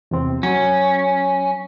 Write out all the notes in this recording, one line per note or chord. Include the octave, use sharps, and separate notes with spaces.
E2 C3 C4
F#3 C#4